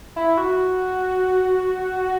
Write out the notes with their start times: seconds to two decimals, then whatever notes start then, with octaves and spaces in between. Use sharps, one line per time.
0.16 E4
0.37 F#4